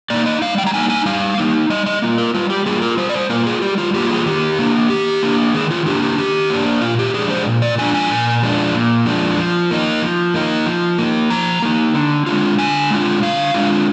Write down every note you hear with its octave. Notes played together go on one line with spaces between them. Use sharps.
A#3 D#4 D5
D#5
G3 F5
G5
A#5
A#3 D#4 G#5
G#5
G3 F5
A#3 D#4
G3 D#5
D#5
A#3 F4
A#4
G3 F4
G4
A#3 F4 G#4
A#4
G3 C5
D5
C5
A#3 F4 A#4
G#4
G3 G4
F4
A#3 F4 G4
G#4
D#3 G4
A#3 D4
D#3 G4
A#3 D4
D#3 G#4
F4
A#3 D4 G4
G4
D#3 G4
A#3 D4
A#2 F4
G4
F3 G#3 D4 G#4
C5
A#2
D5
F3 G#3 D4 G#5
G#5
A#2
F3 G#3 D4
A#2
F3 G#3 D4
F3
A#3 D#4
F3
A#3 D#4
F3
A#3 D#4
F3 A#5
A#3 D#4
D3
G#3 D4 F4
D3 G#5
G#3 D4 F4
D3 F5
G#3 D4 F4